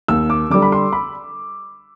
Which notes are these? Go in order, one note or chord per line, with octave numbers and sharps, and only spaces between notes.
D#2 E6
D6
D3 G3 D6
B5
C6
B5